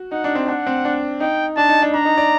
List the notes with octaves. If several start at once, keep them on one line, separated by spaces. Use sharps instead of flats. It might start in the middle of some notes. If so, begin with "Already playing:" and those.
Already playing: F#4
D#4 F#5
D4
C4
D4 F#5
C4
D4
D#4 G5
D4 A5
D#4
D4
D4 A#5
D#4
D5